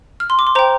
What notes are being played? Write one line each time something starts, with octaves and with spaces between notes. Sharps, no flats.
F6
C6
D6
C6
C5 G5 A#5